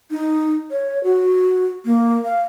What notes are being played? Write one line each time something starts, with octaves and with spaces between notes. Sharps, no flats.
D#4
C#5
F#4
A#3
F5